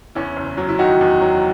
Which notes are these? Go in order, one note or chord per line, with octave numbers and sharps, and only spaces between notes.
E2 C#4 E4
F#1
F#3
E4
D#3 D#4 F#4
E2
F#3